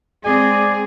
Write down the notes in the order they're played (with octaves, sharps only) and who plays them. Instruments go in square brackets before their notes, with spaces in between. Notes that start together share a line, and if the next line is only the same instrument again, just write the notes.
[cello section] G#3 C4 G#4 [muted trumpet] D5 [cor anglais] G#5